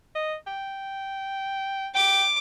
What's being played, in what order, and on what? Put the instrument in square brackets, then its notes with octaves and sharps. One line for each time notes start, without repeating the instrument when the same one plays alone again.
[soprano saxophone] D#5
G5
[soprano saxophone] G5 [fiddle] D6